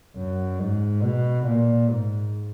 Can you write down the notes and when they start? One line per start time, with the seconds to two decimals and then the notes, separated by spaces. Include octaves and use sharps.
0.17 F#2
0.60 G#2
1.03 B2
1.46 A#2
1.90 G#2